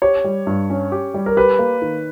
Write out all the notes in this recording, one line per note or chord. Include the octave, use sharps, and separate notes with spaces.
G4 C#5
G3
G2
C#4
G4
G3
A#4
G4 B4
A#3
D#3